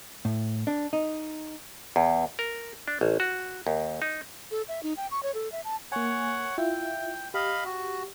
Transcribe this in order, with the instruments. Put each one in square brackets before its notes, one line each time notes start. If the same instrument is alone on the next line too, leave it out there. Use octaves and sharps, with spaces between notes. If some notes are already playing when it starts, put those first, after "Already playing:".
[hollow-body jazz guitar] A2
D4
D#4
[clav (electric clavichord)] E2
A#4
D4
A1
F#4
D#2
D#4
[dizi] A4
E5
D#4
G5
C#6
C#5
A4
E5
A5
[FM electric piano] A#3 G#5 [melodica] C#5 F#5
[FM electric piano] E4 F4 E5 [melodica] G5
[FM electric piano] G4 [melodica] D#5 F5 B5
[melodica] F#4